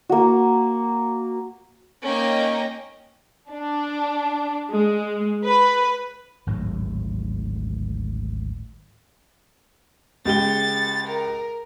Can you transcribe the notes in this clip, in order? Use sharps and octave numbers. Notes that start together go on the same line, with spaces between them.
A#3 F#4
A#3 C#4 D#4 D#5 G5
D4
G#3
B4
G#1 D2 A2 F#3
C#2 G4 A6 G7
A#4